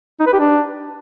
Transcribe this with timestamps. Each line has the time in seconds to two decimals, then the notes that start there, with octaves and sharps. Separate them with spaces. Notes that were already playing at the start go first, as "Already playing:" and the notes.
0.20 D#4
0.26 B4
0.33 G4
0.40 D4